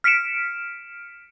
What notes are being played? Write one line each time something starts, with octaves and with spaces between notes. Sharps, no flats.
F6 B6 C#7 D7 E7